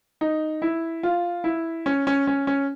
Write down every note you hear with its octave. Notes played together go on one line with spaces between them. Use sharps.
D#4
E4
F4
E4
C#4
C#4
C#4
C#4